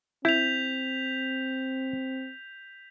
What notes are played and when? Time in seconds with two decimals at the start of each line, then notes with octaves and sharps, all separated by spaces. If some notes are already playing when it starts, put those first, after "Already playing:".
0.25 C4 E4 G6 B6 F7